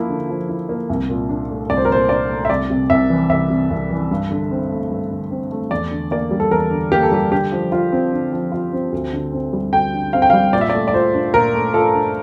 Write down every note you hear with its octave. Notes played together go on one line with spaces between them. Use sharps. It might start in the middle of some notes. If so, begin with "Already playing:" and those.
Already playing: F3 A#3 E4
D3
F3
E4
A#3
C2
A#2
D4
A3
C2 D5
C5
A#4
A#2 C5
D4 D5
A3
E5
C2 D5
C3
C2 E5
E3
C2 E5
C3
C2
E3
G2
D3
C4
A3
G2
D3
C4
A3
E2 D5
D3
A#3 D5
G3
A4
E2 A#4
D3
A#3 G4
A4
G3 G4
D3 G4
F3
F4
C4
D3
F3
F4
C4
D2
D3
C4
G3
D2 G5
D3
C4 F5
G5
G3 F5
A#2 D5
E5
A3 D5
D5
F4 C5
D4
A#2 A#4
A3
F4 A4
D4